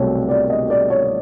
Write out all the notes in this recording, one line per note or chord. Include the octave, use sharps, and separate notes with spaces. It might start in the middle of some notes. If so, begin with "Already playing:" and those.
Already playing: C2 B2 F#3 A3 C4 C#5
D5
D#5
D5
C#5